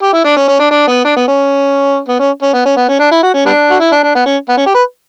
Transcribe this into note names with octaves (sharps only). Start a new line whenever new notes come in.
G4
E4
D4
C#4
C#4
D4
D4
B3
D4
B3
C#4
B3
C#4
C#4
B3
C#4
B3
C#4
D4
E4
F#4
C#4
G3 B3 D4
F#4
E4
D4
D4
B3
C#4
B3
C#4
G4
B4